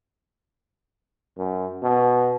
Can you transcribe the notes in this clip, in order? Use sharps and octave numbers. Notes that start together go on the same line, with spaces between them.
F#2
B2